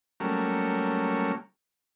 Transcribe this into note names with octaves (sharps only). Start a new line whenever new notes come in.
F#3 G3 A3 A#3 C#4